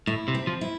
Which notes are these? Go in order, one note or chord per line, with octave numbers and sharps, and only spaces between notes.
A2 E4
C3
C4
F3
E4